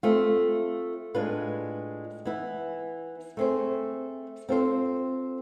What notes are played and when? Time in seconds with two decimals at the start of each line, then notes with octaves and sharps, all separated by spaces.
0.03 A3 C4 F4 A4
1.14 A2 G#3 D4 F4 B4
2.25 E3 B3 E4
3.37 A3 C4 G#4 C5
4.49 C4 F4 A4 C5